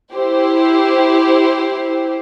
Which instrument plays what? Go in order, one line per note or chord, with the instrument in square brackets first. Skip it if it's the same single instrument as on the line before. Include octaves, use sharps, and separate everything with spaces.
[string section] E4 G4 C5